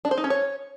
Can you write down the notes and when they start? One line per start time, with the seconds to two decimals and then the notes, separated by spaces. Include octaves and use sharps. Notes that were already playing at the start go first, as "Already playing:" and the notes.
0.05 D4
0.11 C5
0.18 D#4
0.24 C#4
0.30 C#5